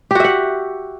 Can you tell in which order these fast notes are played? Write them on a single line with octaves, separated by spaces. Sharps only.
G4 F#4 E5 F#5